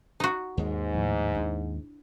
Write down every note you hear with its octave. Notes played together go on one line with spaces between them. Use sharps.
D#4 F#4
D#2 G#2 G#3
A2 F3
D4 E4